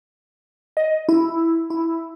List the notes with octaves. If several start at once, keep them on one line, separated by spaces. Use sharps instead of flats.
D#5
E4
E4